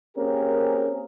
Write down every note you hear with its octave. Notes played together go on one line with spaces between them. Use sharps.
A#3 C4 C#4 G4 G#4 A#4